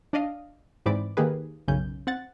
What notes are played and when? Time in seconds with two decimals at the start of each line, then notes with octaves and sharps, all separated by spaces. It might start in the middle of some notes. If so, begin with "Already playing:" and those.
0.13 D4 D5 D#5 F5
0.86 G#2 E3 C4 D5 B5 D6
1.17 D#3 A#3 G4 G#4 B4
1.68 B1 F#2 C#3 C#4 G6
2.07 C4 F#5 A6